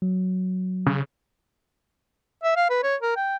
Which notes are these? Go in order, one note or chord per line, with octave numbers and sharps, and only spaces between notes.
F#3
C#3
E5
F5
B4
C#5
A#4
G5